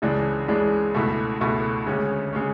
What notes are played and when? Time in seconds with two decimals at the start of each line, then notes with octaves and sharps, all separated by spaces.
0.02 C#2 C#3 E3 G#3 D4
0.48 C#2 C#3 E3 G#3 D4
0.94 C#2 B2 A3 E4
1.41 C#2 B2 A3 E4
1.86 D2 C#3 G#3 C#4
2.33 C#3 G#3 C#4